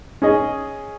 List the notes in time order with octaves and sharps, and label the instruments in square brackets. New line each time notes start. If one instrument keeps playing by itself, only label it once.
[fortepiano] C#4 G#4 D#5